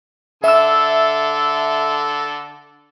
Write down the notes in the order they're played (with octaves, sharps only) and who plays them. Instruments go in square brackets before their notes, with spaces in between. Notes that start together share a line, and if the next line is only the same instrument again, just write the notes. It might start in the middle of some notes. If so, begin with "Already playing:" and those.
[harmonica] D3 A4 [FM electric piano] E5 E6